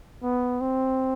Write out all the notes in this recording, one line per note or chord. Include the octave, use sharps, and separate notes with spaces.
B3
C4